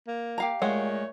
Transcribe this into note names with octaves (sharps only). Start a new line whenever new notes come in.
A#3
G4 F5 A#5
A#2 G#3 A3 C#5 F#5